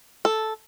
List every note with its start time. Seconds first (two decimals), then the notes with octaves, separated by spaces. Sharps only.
0.25 A4